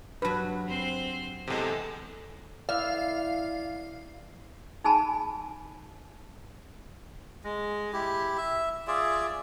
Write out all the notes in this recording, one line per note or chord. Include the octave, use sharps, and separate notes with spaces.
G2 F#3 B4 A5
C4 C5
E2 C3 G#3 A4
E3 D5 E5 F5
D#4 G#4 G#5 A5 B5
G#3
E4 G4
E5
F4 G#4 D5 E5